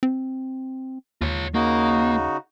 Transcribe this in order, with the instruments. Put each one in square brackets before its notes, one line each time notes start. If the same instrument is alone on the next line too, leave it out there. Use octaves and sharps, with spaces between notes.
[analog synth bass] C4
[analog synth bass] D#2 [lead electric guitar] F4 C#5
[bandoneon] C#3 D#4 F#4 [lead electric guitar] A#3